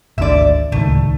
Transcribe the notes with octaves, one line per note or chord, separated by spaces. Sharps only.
G#1 D2 D3 D5 E5
D1 C#2 D#3 A3